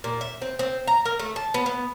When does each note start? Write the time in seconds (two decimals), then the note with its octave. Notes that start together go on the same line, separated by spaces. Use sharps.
0.04 A#2
0.21 E5
0.42 C4
0.59 C4
0.87 A#5
1.05 A#4
1.19 A3
1.36 A5
1.54 B3
1.66 B3